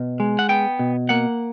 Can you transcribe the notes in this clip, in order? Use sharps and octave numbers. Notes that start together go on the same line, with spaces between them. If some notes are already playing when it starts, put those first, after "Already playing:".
Already playing: B2
G#3
F#5
B3 G5
B2
A#3 F#5